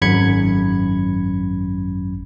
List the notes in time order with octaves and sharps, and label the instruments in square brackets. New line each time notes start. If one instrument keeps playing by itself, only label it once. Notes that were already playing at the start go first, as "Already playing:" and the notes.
[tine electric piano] G#1 F#2 B5 G#6 C#7